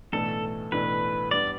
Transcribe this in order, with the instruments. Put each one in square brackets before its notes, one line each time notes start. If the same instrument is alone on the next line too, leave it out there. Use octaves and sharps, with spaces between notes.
[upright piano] B1 A2 E3 A3 D4 [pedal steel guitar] A4
[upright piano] B1 A2 E3 A3 D4 [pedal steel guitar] B4
[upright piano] G2 G3 B3 [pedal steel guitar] D5